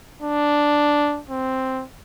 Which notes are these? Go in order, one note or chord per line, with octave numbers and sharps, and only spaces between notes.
D4
C4